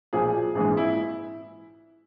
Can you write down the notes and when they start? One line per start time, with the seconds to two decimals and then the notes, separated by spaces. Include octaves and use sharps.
0.13 B1 A#2 F3 G#4
0.55 A#1 G#2 E3 G#4
0.77 E4